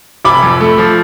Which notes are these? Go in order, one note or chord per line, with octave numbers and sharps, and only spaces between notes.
F1 B5 D6
F2
A3
F3